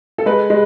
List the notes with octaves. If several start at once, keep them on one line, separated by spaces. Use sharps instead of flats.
A4
G#3 B4
G#3